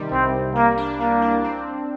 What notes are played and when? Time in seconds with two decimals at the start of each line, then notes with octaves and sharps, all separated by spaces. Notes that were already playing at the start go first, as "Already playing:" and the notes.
Already playing: C3 D#3 G3
0.12 C2 C4
0.34 C2
0.55 G3 A#3
0.77 D4
0.99 G3 A#3
1.22 D4
1.44 C4